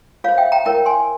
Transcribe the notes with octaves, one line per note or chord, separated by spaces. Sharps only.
F4 C5 C#5 F5
E5 G5
G5 A#5
E4 A#4 C#5 G5 A#5
G#5 C6